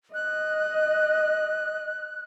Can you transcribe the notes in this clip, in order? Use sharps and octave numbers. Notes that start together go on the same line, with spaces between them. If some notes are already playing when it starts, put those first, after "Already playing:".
D#5 F#6